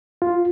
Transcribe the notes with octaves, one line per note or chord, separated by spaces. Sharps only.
F4